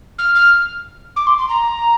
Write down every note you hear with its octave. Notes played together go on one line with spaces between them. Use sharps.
F6
F6
D6
C6
C6
A#5